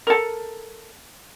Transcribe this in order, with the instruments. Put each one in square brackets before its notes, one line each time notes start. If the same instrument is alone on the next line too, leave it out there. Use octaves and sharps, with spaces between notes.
[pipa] A4 A#4